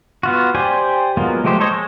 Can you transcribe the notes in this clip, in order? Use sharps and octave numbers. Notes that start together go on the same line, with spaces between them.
B3 F4 F#4
G4 C5 D5 G5 G#5
F#3 G#3 A#3 B3 F4
F3 G#3 A3 G4 C5
A4 C5 C#5 D#5
G#3